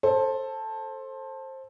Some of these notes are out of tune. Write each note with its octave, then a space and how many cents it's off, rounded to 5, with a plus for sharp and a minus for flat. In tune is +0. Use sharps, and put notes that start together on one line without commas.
A4 +0 C5 +20